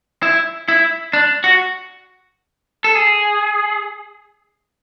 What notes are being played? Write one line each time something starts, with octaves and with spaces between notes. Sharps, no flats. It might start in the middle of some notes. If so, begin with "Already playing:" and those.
E4
E4
D4
F#4
A4
G#4